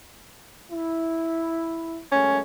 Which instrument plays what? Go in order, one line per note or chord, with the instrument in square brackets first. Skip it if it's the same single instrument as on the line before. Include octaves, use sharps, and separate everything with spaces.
[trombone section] E4
[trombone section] F#2 G#3 A3 [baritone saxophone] C#4